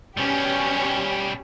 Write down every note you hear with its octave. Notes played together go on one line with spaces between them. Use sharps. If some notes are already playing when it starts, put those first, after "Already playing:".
B2 G3 C#4 G4